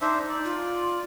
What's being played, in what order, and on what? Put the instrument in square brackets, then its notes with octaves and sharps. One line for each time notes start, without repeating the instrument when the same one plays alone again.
[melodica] D4 C5 E5 [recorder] D#4
[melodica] D5
[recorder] F4